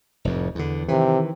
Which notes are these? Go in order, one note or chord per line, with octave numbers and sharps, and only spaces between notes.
F1 F2 A2
E2 D3
C3 D#3 E3